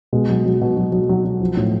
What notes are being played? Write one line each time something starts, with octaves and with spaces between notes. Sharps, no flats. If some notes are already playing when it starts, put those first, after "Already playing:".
B2 G#3
F#3
F#3
B2
F#3
F#3
F#3
F#3
F3
A2